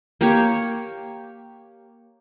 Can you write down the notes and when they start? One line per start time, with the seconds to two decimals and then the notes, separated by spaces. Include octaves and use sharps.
0.21 A#3 G4 C#5